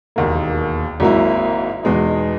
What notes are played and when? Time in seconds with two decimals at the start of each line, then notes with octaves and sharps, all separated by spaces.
0.16 E1 D#2 D#3 A#3
1.00 G#1 G#2 F#3 A#3 E4
1.83 E2 B2 G#3 B3 D#4